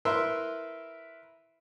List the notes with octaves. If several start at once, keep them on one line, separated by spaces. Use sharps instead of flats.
E4 A#4 B4 E5 C6